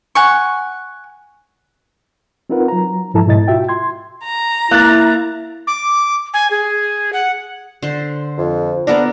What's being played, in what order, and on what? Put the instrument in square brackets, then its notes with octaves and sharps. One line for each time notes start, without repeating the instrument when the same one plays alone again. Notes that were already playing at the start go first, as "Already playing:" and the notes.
[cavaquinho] F#5 G#5 C#6
[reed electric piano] C4 D#4 F4 A#4 B4 F#5
F#3 A#5
G#2 F3 E4 A4 A5 A#5
G#2 B2 E4 D#5 A6
F4 F#4 E5 G5
C6 G#6
[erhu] A#5
[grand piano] A#3 E5 [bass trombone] E4 [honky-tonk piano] F#6 A6
[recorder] D6
G#5
G#4
F#5
[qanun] D3 C5
[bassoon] F2
[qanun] B3 A4 A#4 [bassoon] D4